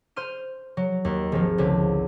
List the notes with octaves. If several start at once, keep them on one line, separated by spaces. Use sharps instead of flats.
C5 C6 F6 D#7
F#3
D#2
G#1 F3
C#2 D3 E4